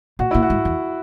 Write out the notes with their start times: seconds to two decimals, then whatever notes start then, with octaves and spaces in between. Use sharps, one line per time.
0.19 A#2 F#4
0.31 A#2 E4
0.43 F#4
0.50 G#2
0.65 E2